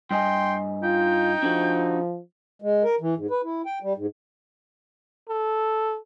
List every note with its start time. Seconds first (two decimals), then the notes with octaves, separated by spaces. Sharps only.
0.11 G2 D#5 G5 G#5 C6
0.83 D#4 F4 G5
1.43 F3 D4 F#4 A4
2.62 G#3
2.84 A#4
3.01 E3
3.17 G#2
3.30 B4
3.44 E4
3.66 G5
3.83 G3
3.97 G#2
5.29 A4